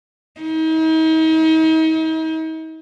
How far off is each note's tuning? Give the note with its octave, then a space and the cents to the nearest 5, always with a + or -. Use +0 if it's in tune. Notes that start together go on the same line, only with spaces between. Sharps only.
D#4 +40